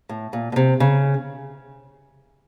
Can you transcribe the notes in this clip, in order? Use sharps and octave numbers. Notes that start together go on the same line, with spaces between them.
A2
A#2
B2
C3
C#3